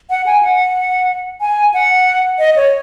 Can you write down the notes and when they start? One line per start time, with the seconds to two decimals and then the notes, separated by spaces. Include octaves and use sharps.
0.10 F#5
0.26 G#5
0.43 F#5
1.41 G#5
1.74 F#5
2.39 D#5
2.56 C#5